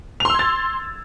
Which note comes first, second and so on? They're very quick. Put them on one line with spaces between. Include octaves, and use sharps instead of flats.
F7 C6 E6 G#6 A6